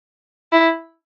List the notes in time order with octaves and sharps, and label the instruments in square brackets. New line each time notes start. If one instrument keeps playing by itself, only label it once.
[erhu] E4